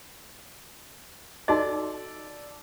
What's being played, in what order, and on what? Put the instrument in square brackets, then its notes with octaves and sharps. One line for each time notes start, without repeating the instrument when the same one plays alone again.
[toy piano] D#4 F#4 D#5 [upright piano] A4 D5